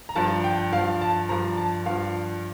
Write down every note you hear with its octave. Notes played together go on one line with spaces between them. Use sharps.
A#5
G2 F3 A5
G5
G2 F3 F5
A5
G2 F3 A#5
A5
G2 F3 F5